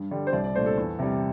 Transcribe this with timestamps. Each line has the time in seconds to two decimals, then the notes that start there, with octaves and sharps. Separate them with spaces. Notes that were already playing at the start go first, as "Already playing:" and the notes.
Already playing: G2
0.11 D3 G3 D4
0.27 C5
0.33 C2 D5
0.44 D5
0.55 A#2 A3 D4 C5
0.66 A4
0.77 E2
0.99 C3 G3